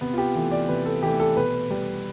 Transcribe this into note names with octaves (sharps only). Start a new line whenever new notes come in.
C3 B3
F4
G4
E3 A3
D5
C3 B4
A4
E3 A3 G4
A4
B2 B4
G3